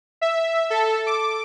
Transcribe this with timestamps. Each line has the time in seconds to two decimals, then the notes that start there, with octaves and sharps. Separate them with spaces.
0.21 E5
0.70 A4
1.07 D6